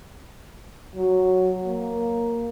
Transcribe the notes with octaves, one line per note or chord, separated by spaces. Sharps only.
F#3
A#3